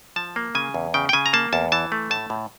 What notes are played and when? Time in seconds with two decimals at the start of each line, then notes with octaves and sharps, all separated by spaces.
0.16 F3 A5
0.36 A#3
0.55 C#3 G#5
0.74 E2
0.94 C#3 G5
1.09 G5
1.13 C#3 G#5
1.26 A#5
1.33 A#3 A5
1.53 E2 A5
1.72 E3 A5
1.92 A3
2.11 A2 A5
2.30 A2